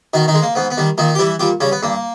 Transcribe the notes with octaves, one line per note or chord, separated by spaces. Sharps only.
B2 D#3 D#4
D#3 D#4
G#3
A#3
G#2 B3
B3
D#3 G3
A#2 D#3 D#4
G4
E3 G3 E4
A#2 G3 G4
C#3 G3 C#4
B3
G2 A#3